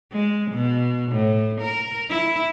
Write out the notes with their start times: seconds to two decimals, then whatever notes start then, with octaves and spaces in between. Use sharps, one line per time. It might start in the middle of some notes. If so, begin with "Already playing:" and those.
0.12 G#3
0.51 B2
1.12 A2
1.61 A#4
2.09 E4